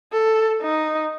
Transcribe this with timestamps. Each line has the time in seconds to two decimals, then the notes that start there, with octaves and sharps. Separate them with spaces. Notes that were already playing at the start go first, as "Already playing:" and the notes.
0.12 A4
0.62 D#4